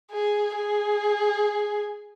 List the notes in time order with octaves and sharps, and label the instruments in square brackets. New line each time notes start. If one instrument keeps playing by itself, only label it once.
[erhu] G#4
G#4